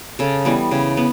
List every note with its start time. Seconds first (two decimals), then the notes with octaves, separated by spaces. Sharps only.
0.19 C#3 A4
0.45 E3 G3 B3
0.71 C#3
0.97 B3